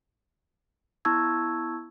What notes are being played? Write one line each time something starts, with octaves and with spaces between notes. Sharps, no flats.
B3 E4 A5 C#6 E6 G#6